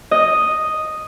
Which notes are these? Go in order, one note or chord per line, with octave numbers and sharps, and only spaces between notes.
D#5